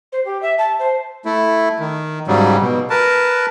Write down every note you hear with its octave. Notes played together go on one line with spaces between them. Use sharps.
C5
G4
E5
A5
C5
A3 E4
D#3
G#2 C#3 F#3 G3
B2
A#4 B4 A5